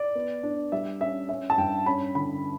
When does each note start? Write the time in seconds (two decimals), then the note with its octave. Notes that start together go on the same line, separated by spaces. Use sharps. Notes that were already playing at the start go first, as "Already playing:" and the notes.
Already playing: D5
0.15 B3
0.43 D4
0.72 G3 E5
1.01 C#4 E5
1.29 C#4 E5
1.50 A5
1.58 G2 G5
1.86 C#4 B5
2.15 D3 B5